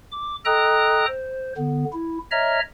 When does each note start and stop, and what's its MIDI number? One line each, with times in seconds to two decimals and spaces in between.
0.11 0.35 86
0.45 1.06 69
0.45 1.06 75
0.45 1.06 79
0.45 1.06 82
0.45 1.06 87
0.45 1.06 90
1.07 1.53 72
1.57 1.85 50
1.57 1.85 59
1.93 2.18 64
2.31 2.60 73
2.31 2.60 75
2.31 2.60 76
2.31 2.60 82
2.31 2.60 89